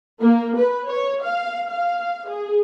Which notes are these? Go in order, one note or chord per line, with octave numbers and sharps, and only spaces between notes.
A#3
B4
C#5
F5
F5
G#4